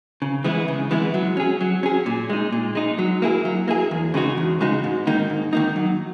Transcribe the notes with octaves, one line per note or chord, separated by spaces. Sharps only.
C#3
E3 G#3 B3 E4
C#3
E3 G#3 B3 E4
F#3
C#4 G#4
F#3
C#4 G#4
A#2
G#3 D#4
A#2
G#3 D#4
F#3
A#3 E4 G#4
F#3
A#3 E4 G#4
E2
C#3 G#3 D#4 F#4
E2
C#3 G#3 D#4 F#4
G#2
D#3 A#3 D#4
G#2
D#3 A#3 D#4
F#3